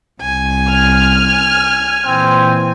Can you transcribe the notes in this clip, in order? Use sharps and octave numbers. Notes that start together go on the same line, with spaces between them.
C2 G#5
F6
A#2 E3 C4